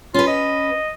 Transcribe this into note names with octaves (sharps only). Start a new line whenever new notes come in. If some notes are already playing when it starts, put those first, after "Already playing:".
C#4 F4 B4
D#5